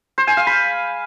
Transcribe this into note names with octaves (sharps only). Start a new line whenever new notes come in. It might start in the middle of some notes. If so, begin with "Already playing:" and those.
C5
G#5
F5
B5